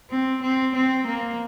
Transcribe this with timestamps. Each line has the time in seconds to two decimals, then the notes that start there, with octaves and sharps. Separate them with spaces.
0.10 C4
0.42 C4
0.74 C4
1.07 A#3